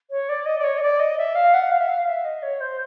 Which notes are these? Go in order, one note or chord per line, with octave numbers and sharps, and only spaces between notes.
C#5
D5
D#5
D5
C#5
D#5
D5
D#5
E5
F5
F#5
F5
E5
F5
E5
D#5
C#5
C5